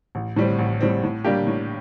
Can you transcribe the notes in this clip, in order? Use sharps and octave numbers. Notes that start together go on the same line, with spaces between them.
A1
A2 G3 C4
A1
A2 G3 C4
A2
G3 A#3 D4 G4
A2